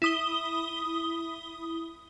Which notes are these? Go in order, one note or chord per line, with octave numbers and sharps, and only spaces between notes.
E4 D#6 G7